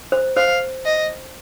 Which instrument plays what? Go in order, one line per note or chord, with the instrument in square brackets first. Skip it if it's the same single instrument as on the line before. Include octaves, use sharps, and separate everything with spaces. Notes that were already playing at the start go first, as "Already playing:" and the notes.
[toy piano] C5
[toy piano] C5 [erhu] F5
[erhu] D#5